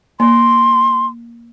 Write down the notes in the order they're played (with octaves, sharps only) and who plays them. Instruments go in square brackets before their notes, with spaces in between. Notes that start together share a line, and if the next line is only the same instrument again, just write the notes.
[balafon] A#3 [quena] C6